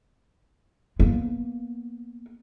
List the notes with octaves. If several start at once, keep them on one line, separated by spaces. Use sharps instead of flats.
A#3 B3